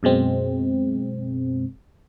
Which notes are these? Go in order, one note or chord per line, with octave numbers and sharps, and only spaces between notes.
F#2 B2 G#3 C4